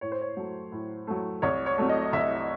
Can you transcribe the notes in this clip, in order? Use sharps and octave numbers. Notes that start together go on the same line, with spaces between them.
A2 C#5
C5
C#5
F#3 A3
A2
F#3 A3
C2 C#5
C#5
C3 F#3 A3
D#5
C2 E5